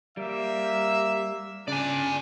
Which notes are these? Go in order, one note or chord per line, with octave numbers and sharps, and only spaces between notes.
G3 A#3 E5
C#3 D4 D5 G#5